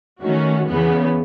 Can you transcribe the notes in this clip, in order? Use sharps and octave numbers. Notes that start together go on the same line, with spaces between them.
D#3 A3 C#4 F#4
E2 C#3 E3 B3